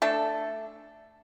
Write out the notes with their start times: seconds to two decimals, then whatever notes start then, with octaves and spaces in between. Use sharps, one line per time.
0.02 A3 D4 A4